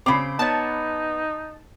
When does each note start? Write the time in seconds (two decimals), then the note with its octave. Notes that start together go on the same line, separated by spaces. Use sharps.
0.06 C#3 C4 B5 D6
0.39 B3 D#4 C#5 A5